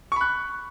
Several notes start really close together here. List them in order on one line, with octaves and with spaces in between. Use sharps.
C#6 B5 F#6